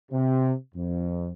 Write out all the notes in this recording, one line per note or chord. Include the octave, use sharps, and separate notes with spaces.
C3
F2